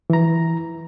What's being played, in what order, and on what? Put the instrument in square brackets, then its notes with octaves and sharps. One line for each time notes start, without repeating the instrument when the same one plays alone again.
[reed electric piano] E3 A#5